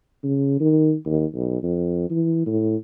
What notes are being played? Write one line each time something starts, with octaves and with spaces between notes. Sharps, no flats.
C#3
D#3
D#2
B1
F2
E3
A2